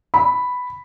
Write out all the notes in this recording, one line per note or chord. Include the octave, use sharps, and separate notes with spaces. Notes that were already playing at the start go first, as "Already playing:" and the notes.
B5